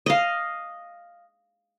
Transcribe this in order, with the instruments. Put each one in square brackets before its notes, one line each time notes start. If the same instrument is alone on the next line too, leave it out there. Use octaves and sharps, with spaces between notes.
[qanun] D#5 F5